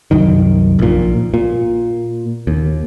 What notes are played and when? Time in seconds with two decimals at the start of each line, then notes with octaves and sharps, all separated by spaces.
0.11 C2 F#2 D#3
0.79 A#1 A#2
1.34 A#2
2.47 D#2